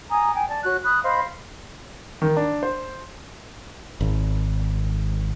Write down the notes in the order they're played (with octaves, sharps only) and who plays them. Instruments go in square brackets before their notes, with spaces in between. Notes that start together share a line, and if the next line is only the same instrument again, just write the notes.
[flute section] G#5 A#5 D#6
G5 G#5
D5 A5
F#4 C#5 F#6
B5 D#6 E6 F#6
C5 D#5 F5 B5
[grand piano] D#3
D4
C5
[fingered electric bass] G#1